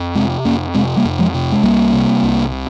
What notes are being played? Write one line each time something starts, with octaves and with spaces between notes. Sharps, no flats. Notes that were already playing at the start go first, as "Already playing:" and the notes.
Already playing: F2
C3 G#3 C4
F2 A#3 C#4
C3 G#3 C4
G3 A#3
F2
F3 G#3
C3
G#3
C2 G3 A#3
C3
C2
C3